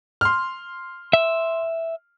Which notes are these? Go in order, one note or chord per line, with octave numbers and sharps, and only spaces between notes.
C6 F6
E5